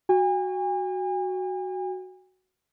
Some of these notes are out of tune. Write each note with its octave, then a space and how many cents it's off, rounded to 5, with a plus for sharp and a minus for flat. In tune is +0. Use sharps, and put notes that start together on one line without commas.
F#4 +0 G#5 -45